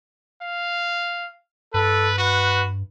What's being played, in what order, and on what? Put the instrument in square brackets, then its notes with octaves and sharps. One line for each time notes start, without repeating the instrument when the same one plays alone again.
[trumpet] F5
[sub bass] G2 [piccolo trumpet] A4 [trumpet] B4
[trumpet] F#4 [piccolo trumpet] B4